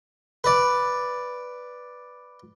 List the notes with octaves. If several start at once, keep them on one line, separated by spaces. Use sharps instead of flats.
B4 D5